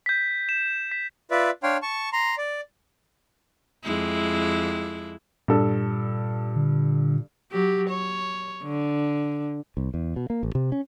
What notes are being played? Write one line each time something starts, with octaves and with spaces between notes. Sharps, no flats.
G6 B6
E7
B6
F4 B4 D5 E5
D4 C#5 F5 G5 C6
A5 C#6
A#5 C6
D5
F2 G#3 E4
G2 A#2 A4
D3
F#3 G4
C#5
D3
C2
E2
B2
A#3
A1
C3
C#4